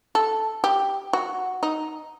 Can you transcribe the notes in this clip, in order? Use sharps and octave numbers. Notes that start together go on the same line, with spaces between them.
A4
G4
F#4
D#4